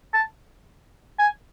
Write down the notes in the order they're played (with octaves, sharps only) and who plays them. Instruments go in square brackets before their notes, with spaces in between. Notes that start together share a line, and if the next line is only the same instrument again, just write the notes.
[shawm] A5
G#5